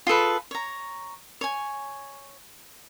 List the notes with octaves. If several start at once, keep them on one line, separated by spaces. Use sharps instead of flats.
F4 G#4 A4 B4
C#5 A#5
C#5 G#5